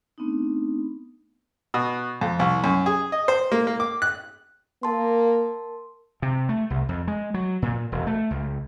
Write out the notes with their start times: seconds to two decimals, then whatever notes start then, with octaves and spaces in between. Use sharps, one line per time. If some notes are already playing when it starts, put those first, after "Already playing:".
0.18 A3 B3 C4 D4 D#4
1.74 B2
2.21 F2
2.39 C2
2.64 F#2
2.86 G#4
3.12 D#5
3.28 C5
3.52 A#3
3.67 A#3
3.80 D6
4.02 F#6
4.83 A#3 A#4 A5 C6
6.22 C3
6.49 A3
6.70 C2
6.89 F2
7.08 G#3
7.34 F#3
7.62 A#2
7.92 E1
8.07 A3
8.31 C#2